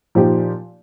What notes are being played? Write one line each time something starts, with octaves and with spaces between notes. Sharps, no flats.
A#2 F3 D#4 G4